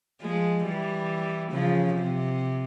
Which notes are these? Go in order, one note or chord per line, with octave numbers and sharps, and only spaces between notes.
F3 G#3
E3 G3
C#3 F3
C3